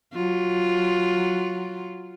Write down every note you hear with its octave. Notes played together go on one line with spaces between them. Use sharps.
F#3 F4